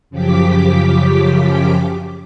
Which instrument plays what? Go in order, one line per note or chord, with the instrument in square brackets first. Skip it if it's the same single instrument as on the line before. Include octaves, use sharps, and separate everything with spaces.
[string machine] F#2 C#3 F3 G4 D6 B6